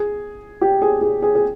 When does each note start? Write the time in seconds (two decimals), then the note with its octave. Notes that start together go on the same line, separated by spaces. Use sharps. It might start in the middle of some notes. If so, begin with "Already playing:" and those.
Already playing: G#4
0.61 G4
0.82 G#4
1.01 G#4
1.22 G#4
1.35 G#4